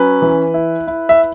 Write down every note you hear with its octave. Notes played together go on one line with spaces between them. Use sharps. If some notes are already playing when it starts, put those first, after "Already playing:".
Already playing: F#3 C#4 B4
E3
E4
E4
E5